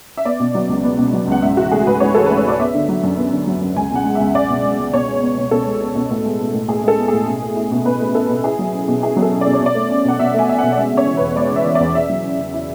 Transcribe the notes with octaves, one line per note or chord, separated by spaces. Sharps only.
E5
B3 D5
B2
F#3
C#2
B3
B2
F#3
C#2 F#5
G#2 E5
E3 F#4
A3 G#4
G#2 B4
G#2 C#5
E3 A4
A3 B4
C#5
G#2 D5
B3 E5
D3
F#3
F#2
B3
D3
F#3
F#2
C#2 G#5
B2 F#5
G#3
C#2 E5
C#2 D5
B2
G#3
C#2
B2 C#5
G#3
B3
B2
B2 A4
G#3
B3
B2
A2
G#3
B3
A2
A2 G#4
G#3 A4
B3
G#4
A2
B2
A3
E4
B2
B2 B4
A3
E4 A4
B2
E4 G#4
F#3
C#4
B2
E4 G#4
F#3
A4
C#4
D5
B2
C#5
B2
D5
A3
C#4
B2 F#5
B2 E5
A3 G#5
C#4 E5
F#5
B2
D5
G#3 E5
C#3
C#5
E3
E2 B4
G#3 D5
C#3
E5
E3
E2 D5
E4 E5
F#3
C#4
C#3
E4